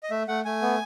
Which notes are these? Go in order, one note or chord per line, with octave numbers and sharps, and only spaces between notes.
D#5
A3 E5
A3 F#5
A3 G#5
B3